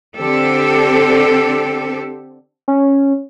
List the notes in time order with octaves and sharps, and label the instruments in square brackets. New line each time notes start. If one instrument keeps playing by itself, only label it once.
[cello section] D3 C4 G4 A4
[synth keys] C#4